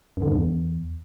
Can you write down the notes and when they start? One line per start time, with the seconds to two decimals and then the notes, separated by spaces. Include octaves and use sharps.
0.17 F#2
0.22 D3
0.27 G2
0.32 E2